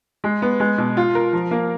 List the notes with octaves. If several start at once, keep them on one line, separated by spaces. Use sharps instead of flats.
G#3
B3
G#3
B2
F4
A#4
F3
A#3